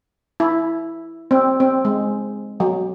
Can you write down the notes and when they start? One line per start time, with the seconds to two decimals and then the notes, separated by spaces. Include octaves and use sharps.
0.40 E4
1.31 C4
1.60 C4
1.85 G#3
2.60 F#3